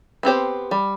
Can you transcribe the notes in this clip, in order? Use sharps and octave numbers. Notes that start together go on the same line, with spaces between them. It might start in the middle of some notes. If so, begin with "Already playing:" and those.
B3 C4 G4 C5
G3